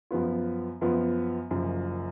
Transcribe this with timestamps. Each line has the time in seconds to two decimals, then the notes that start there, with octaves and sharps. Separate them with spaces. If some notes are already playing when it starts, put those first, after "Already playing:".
0.11 F#2 F3 B3 F4
0.81 F#2 F3 B3 F4
1.51 F#1 F#2 F3